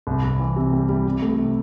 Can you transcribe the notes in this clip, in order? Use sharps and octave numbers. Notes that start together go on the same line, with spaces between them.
C2
C2
E3
C3
G3
G3
C3
A3
C3